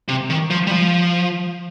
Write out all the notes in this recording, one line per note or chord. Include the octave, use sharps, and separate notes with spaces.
C3
D#3
F3
G3
F3